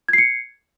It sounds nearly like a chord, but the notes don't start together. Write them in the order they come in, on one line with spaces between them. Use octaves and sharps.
G#6 C7 C#7